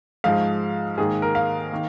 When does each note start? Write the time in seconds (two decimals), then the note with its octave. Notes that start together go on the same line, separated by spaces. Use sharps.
0.24 G#2 F3 G#3 F5
0.98 G#2 D#3 A#3 G#4
1.22 A#4
1.35 F5
1.72 D#3 A#3